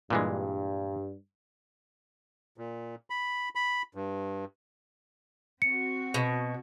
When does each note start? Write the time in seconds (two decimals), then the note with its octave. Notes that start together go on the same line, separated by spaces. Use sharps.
0.10 G2 A#2 E3 G#3
2.58 A#2
3.10 B5
3.55 B5
3.95 G2
5.62 C4 F#4 C#7
6.14 B2